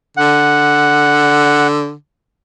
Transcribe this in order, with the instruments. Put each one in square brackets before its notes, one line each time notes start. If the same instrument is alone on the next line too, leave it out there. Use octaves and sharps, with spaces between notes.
[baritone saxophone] D3 [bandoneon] F#5